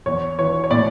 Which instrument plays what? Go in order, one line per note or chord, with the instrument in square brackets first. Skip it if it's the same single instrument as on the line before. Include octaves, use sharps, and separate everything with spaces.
[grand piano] E2 [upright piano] C#5
[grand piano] E3 [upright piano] C#5
[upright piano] C#5
[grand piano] A2 [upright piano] D5